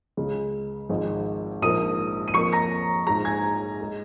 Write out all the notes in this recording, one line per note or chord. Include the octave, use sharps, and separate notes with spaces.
C#2 C#3 G#3
G#1 G#2 F3 G#3
A#1 G#2 F3 A#3 D#6 D#7
D#7
F2 F3 A#3 C#6 C#7
A#5 A#6
A#1 G#2 G#3 A#5 A#6
G#5 G#6
G#3